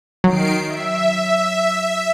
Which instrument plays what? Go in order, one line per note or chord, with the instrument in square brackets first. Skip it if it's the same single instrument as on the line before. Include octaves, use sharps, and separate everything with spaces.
[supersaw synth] D#3 C7 D7 [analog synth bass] F#3
[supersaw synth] E5